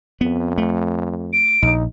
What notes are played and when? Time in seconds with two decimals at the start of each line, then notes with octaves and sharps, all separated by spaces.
0.21 F2 B3
0.58 A3
1.33 D7
1.62 A#1 D#4